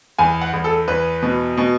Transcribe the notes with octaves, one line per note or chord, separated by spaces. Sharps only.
E2 G#5
F#5
E2
A4
E2 B4
B2
B2